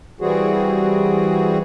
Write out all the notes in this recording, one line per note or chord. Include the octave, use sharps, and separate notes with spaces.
E3 G3 C4 F#4 G#4